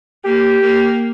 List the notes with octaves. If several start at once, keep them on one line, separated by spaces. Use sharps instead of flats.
A#3 G4
A#3